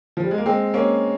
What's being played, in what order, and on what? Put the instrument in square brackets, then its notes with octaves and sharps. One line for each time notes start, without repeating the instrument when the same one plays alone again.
[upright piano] F3
G3
G#3
A#3
G#3 C4
A#3 C#4